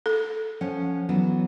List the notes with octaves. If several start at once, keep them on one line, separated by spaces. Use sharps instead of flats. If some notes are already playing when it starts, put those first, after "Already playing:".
A4
F3 C#4 F#5
E3 F#3 B3